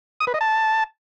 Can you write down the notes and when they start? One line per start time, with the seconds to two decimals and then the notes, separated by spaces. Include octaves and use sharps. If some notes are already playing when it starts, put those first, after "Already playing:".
0.20 D#6
0.27 B4
0.34 D#5
0.41 A5